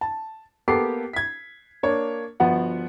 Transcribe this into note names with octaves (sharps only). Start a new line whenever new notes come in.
A5
A#3 B3 G4 A4 D6 C7
G#6 B6
A#3 D4 C#5
G1 F3 B3 F#4 F#5